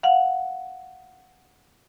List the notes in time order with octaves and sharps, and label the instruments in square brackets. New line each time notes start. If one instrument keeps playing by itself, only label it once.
[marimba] F5 F#5